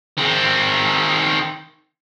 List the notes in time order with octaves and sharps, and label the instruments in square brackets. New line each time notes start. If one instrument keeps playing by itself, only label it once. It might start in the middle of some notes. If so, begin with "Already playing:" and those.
[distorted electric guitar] D#3 C4